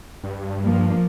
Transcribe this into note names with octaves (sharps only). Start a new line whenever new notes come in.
G2
F3 A#3